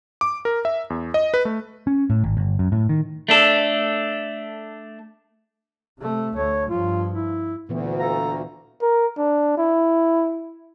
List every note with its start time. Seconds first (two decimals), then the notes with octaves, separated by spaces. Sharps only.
0.21 D6
0.45 A#4
0.65 E5
0.90 E2
1.14 D#5
1.34 B4
1.45 A3
1.87 C#4
2.10 A2
2.24 G#1
2.37 G1
2.59 F#2
2.72 A2
2.89 D#3
3.29 A3 D4 A4
6.00 C3 A3
6.35 D2 A3 C#5
6.70 G2 F3 F4
7.15 E4
7.69 D2 A#2 E3 B3
7.99 F4 A4 A#5
8.82 A#4
9.17 D4
9.57 E4